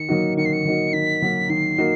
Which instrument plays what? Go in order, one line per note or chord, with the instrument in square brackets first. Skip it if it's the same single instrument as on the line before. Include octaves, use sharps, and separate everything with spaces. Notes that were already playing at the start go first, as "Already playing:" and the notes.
Already playing: [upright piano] D#3 [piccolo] C#7
[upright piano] F#3 A#3 D#4 F#4
[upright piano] D#3 [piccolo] C#7
[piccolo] C7
C#7
[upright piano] F#3 A#3 D#4 F#4
[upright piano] D#3 [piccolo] B6
[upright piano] F#3 A#3 D#4 F#4
[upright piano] D#3 [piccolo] C7
[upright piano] A#3 D#4 F#4